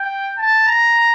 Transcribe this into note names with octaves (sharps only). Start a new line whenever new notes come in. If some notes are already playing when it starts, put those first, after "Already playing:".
Already playing: G5
A5
A#5